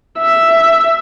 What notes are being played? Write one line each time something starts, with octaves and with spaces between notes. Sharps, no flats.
E5